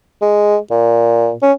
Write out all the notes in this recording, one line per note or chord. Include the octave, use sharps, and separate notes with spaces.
G#3
A#2
C#4